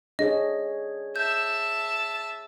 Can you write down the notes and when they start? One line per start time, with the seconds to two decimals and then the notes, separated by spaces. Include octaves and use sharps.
0.19 D4 G#4 C#5 D#5
1.16 E5 A5 G6